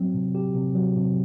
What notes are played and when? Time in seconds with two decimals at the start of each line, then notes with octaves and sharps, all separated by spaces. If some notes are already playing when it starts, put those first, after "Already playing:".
Already playing: F#3 C4
0.14 C3
0.35 G4
0.55 C3
0.75 F#3
0.96 C3